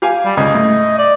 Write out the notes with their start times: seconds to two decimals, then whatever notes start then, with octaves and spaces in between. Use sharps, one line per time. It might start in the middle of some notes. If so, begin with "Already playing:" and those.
0.02 G4 F5 G#5
0.25 G3
0.37 C#2 C#3 D#5
0.55 A2
0.98 D5